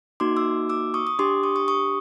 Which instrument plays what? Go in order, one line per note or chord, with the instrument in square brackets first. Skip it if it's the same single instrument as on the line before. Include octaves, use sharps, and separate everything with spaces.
[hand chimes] A#3 D#4 F#4 C6 D6
D6 E6
D6 E6
C#6 D#6
D#6
D4 G4 C6 D6
C#6 D#6
C#6 D#6
C#6 D#6